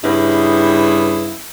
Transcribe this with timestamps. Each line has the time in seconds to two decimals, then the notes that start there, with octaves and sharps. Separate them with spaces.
0.04 G2 C#3 B3 E4